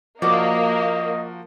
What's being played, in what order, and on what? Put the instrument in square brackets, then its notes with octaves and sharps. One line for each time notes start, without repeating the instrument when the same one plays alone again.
[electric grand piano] F3 F#4 A#4 [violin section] A#3 [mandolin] D5 [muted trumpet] D#5